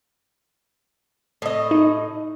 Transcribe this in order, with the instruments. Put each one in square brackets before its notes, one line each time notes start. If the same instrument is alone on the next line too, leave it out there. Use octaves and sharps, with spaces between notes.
[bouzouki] A2 D#5
[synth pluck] D#4